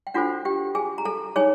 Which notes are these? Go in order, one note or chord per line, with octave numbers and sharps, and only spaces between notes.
G5
D4 F4 F#4 A4 C5 F#5
G4 G5
G#4 G#5
A#5
A4 A5
D#4 G#4 C#5 G#5